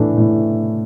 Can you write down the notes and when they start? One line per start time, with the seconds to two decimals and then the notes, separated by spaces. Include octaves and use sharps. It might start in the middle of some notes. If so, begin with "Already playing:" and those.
Already playing: A2 E3 A3 D4
0.17 A2